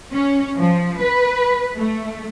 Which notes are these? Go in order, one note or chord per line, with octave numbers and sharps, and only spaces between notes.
C#4
F3
B4
A3